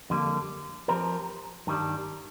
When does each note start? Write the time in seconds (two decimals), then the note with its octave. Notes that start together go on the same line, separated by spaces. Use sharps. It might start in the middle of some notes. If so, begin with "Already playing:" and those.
0.10 F2 D3 G3 A#3
0.88 F3 C4 G4 A#4
1.67 G2 D#3 G3 D4